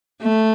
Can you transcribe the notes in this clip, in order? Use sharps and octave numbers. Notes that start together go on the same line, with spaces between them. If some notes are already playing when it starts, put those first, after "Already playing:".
A3